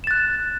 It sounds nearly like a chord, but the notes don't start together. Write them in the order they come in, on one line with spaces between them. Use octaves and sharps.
E7 A6 F#6